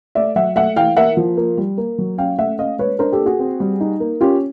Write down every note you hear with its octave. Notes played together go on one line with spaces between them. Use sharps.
A3 D5 E5
F#3 E5 F#5
A3 E5 F#5
E3 F5 G5
A#3 E5 F#5
F3
A#3
G3
A#3
F#3
C#4 F5 G5
A3 E5 F#5
C#4 D#5 F5
G#3 B4 C#5
D4 A#4 C5
G4 A4
A#3
F#4 G#4
C4
G3
D#4
A#3
C#4 F4 G4